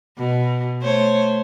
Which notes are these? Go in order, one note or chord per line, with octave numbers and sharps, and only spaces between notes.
B2
A3 C5 C#5